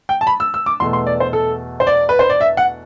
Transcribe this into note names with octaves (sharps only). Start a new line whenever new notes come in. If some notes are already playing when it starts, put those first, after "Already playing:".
G5
A5
B5
E6
E6
D6
E2 B2 A3 C6
C6
D5
C5
A4
C5
D5
B4
C5
D5
E5
F#5